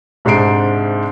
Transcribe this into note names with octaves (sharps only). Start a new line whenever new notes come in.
C2 G#2 D4 C5 C7 D7